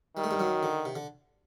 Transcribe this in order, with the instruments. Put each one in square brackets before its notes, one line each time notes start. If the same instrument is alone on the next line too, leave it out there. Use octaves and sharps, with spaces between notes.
[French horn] D#3 [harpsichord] G3
[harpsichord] A3
G2 G3
F#2 F#3
D3
C3
D3